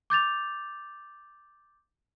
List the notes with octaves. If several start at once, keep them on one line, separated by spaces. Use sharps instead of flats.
D6 G6 A6 F7